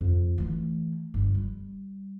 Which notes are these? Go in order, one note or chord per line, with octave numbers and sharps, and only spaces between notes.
F2
E3 A3
G1
G3